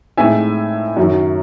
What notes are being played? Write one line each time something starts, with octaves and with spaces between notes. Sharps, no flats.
A2 G#3 C4 D#4 E5 G#5
F#2 D#3 F#3